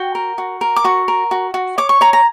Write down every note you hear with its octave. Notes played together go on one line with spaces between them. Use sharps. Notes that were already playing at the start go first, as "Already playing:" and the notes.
Already playing: F#4 G5
A#4
F#4
A#4
D6
F#4 C#6
A#4
F#4
F#4
C#5 D6
C#6
C#5 A#5
A#5